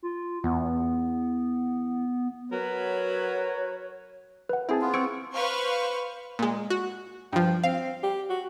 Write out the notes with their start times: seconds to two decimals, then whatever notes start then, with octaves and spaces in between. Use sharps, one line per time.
0.03 F4
0.44 E2 B3
2.52 F#3 F#4 A#4 B4 C#5
4.49 B4 F#5
4.69 C4 E4 G#4 A5
4.82 B3 F4
4.94 C4 C#6 E6 G#6 D7
5.33 B4 C5 F5 C#6
6.39 A#2 G#3
6.70 F#4
7.33 G2 F3 G5
7.64 C4 F5
8.03 G4
8.30 F#4